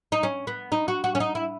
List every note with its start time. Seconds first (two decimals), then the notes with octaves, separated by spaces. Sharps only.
0.12 D#4
0.23 C#4
0.47 B3
0.72 D#4
0.88 F#4
1.04 F#4
1.15 C#4
1.20 D#4
1.35 E4